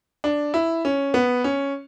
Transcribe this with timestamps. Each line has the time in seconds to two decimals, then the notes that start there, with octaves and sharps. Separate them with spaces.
0.24 D4
0.54 E4
0.85 C#4
1.14 B3
1.44 C#4